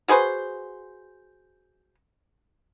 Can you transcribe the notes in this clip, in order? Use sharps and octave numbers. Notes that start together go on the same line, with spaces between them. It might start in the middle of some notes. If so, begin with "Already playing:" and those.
F#4 G#4 B4 C5